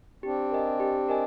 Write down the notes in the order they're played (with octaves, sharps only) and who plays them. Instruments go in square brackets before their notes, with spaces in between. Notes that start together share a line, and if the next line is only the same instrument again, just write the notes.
[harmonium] C4 D4 [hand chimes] G4
[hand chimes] A#4 D#5 G#5
G4
A#4 D#5 G#5